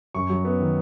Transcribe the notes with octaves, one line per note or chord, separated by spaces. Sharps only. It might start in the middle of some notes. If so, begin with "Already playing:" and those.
F#2 C#6
F#3
B3
D#3